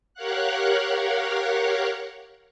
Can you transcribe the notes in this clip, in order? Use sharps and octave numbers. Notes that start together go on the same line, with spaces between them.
G4 A#4 C#5 F5 F#5 F#6